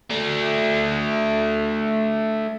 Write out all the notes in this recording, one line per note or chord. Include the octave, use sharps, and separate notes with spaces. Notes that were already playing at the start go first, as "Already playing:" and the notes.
A3 D4